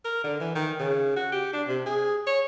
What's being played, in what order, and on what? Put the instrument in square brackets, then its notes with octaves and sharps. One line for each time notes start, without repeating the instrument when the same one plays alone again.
[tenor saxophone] A#4
D3
E3
D#3
C#3
F#4
G4
D4
C3
G#4
C#5